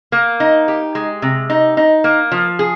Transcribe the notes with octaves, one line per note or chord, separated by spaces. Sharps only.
A#3
D#4
G4
G#3
C3
D#4
D#4
A#3
F3
G#4